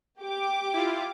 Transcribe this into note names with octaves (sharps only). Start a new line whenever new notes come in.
G4 D6
E4 F4